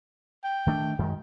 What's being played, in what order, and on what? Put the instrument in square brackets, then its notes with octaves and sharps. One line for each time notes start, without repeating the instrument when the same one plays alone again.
[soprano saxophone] G5
[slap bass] D#3 A3 D4
F#2 D#3 G#3